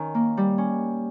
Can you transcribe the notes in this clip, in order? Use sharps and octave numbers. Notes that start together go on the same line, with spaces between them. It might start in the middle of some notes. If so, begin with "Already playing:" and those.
Already playing: D#3 C#4
A#3
G3
C#4